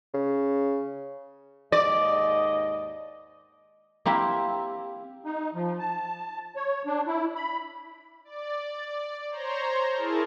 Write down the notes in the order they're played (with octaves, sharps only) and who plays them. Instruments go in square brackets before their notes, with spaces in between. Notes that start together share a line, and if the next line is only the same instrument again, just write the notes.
[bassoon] C#3
[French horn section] D#2 G#2 D#5 [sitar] D5
[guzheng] A#3 C4 E4 G4
[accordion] D#4
F3
A5
C#5
D4
E4
B5
[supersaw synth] D5
C5 C#5 A#5 C6
E4 G#4 A#4 A5